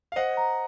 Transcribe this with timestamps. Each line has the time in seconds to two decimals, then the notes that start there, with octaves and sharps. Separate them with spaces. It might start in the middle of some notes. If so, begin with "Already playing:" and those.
0.12 F5
0.16 C5 D#5 F#5
0.37 A#5